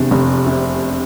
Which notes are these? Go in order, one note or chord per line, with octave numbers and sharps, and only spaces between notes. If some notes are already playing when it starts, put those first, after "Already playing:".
Already playing: F1 E2 C3 D4
F1
C3